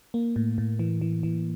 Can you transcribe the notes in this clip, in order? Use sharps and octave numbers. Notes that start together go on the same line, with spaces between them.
A#3
A2
A2
E3
E3
E3